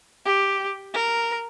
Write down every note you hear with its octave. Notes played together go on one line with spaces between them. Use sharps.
G4
A#4